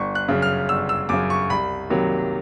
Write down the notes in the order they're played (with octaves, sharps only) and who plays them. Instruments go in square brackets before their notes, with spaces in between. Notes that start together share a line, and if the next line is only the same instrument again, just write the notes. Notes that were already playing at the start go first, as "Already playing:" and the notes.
Already playing: [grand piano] G1 C#6
F#6
F#2 C#3
F6
G1 E6
E6
F#2 C#3 D6
C#6
C2 B5
C3 D#3 F#3 A#3